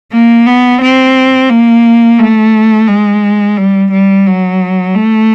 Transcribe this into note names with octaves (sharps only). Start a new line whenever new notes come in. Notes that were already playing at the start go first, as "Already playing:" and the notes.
A#3
B3
C4
A#3
A3
G#3
G3
G3
F#3
A3